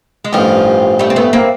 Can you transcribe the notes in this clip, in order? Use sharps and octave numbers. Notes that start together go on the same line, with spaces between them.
G#3
A1 G2 D#3 F3 G3
G3 A3
C4
A3 B3
A#3 C4